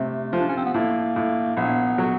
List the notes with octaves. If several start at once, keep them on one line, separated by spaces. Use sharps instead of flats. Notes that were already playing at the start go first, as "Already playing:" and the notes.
Already playing: C3 A3
F3
D4
C#4
C4
B3
A2 A#3
A2
A#1 B3
F#3